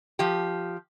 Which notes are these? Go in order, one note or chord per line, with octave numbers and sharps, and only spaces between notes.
F3 G4